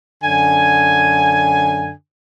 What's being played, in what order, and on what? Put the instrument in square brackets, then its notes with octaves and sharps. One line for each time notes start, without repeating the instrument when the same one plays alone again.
[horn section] F#2 D3 G#5